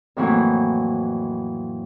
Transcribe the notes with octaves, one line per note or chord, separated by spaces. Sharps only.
F2 A2 E3 F#3 A3 A#3